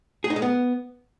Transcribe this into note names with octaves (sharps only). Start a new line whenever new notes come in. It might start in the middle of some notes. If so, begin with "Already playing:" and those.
G#4
D#4
G#3
B3